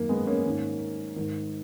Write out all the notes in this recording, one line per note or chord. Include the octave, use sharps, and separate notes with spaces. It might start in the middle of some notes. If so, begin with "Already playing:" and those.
Already playing: F#2 D#3 A#3
G#3 B3
A#3 C#4
G#2 D#3
G#2 D#3